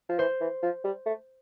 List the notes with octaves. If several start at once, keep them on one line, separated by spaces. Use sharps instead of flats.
F3
E3 C5
E3
F3
G3
A3